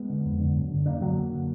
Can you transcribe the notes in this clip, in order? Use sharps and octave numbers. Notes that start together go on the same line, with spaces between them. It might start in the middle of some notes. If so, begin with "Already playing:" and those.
Already playing: G#3 B3
D3
F2
D3
F#2
D3
F#2 A#3 D4
D3 F#3 A#3
F#2
D3